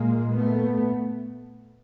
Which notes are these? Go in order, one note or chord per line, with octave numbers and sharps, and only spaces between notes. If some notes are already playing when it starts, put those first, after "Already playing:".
Already playing: A#2 G#3 A#3
A3 B3